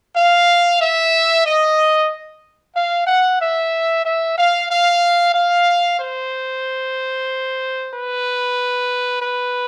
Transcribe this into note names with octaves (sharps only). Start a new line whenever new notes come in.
F5
E5
D#5
F5
F#5
E5
E5
F5
F5
F5
C5
B4
B4